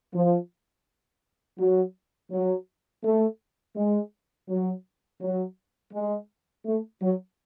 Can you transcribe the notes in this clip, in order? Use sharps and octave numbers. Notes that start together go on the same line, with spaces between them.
F3
F#3
F#3
A3
G#3
F#3
F#3
G#3
A3
F#3